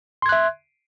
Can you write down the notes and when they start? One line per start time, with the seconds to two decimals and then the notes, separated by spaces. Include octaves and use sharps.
0.22 C6
0.26 G#6
0.29 F#6
0.32 E5